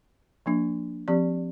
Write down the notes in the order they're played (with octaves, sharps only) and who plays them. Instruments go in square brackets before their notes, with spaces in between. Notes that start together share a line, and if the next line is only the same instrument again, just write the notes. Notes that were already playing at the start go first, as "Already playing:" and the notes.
[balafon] F3 A#3 D4
F3 C4 G4 D5